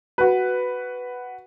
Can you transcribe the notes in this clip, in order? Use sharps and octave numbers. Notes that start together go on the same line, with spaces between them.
F#4 B4